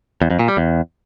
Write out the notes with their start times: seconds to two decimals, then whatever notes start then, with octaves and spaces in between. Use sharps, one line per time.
0.22 E2
0.30 F2
0.39 A#2
0.48 G3
0.57 E2